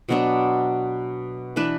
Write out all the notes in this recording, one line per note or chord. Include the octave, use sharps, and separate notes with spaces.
B2 F#3 B3 D4
E3 D4 B4